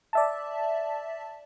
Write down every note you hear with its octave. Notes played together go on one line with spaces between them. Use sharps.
D5 E5 A5